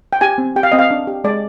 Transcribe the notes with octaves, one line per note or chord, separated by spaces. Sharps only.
G5
G4 G#5
C4
G4 G5
F5
C4 D#5
F5
D4
G4
G#3 D5